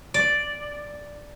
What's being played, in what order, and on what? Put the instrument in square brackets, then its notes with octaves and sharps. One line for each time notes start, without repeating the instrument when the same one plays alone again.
[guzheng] D5